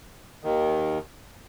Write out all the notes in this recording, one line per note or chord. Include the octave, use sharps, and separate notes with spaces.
D#2 D#3